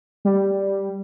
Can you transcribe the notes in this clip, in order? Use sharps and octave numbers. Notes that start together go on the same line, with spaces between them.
G3